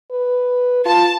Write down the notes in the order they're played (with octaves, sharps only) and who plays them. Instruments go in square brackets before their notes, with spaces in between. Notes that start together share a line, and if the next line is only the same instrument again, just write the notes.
[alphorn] B4
[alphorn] F4 [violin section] A5